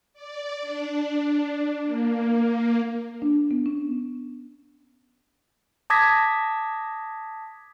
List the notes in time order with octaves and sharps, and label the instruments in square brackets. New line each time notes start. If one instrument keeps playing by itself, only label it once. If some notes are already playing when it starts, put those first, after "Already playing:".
[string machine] D5
D4
A#3
[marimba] D4
B3
C#4
[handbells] A5 D6 D#6 G#6 A#6 B6